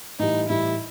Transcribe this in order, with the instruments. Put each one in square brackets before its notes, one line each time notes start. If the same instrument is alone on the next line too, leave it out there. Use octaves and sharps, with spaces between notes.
[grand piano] A2 E3 G3 [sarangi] D#4
[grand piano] A2 E3 G3 [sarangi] E4